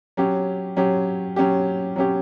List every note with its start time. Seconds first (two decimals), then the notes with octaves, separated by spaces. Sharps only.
0.17 F#3 C#4 G4
0.77 F#3 C#4 G4
1.36 F#3 C#4 G4
1.96 F#3 C#4 G4